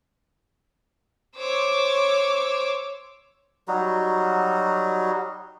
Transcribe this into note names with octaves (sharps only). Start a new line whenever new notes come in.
C5 C#5 D6 E6
F#3 G3 D#4 F#4